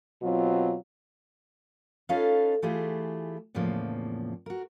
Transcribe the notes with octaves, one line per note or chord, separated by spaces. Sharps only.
B2 F#3 C4 F4
C#4 D#4 F4 A4 B4 F5
E3 A3 E4 F4 G4 G#4
E2 A2 C#3 F3 A#3
F#4 A#4